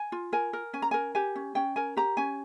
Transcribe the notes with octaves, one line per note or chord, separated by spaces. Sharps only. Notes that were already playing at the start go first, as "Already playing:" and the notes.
Already playing: G#5
F4
A#4 G#5
A#4
C#4 G#5
A#5
A#4 G#5
G4 G#5
C#4
C#4 G5
A#4 G#5
G4 A#5
C#4 G#5